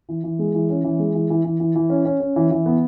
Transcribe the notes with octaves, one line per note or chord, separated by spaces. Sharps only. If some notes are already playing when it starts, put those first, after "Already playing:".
E3
E3
G#3
E3
C#4
E3
G#3
E3
E3
E3
E3
E3
C#4
C#4
C#4
E3
E3
B3